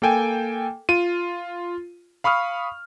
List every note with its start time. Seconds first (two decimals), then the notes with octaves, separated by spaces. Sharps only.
0.02 A#3 A4 G5 G#5
0.89 F4 D#7
2.24 F5 B5 C#6 D#6 F6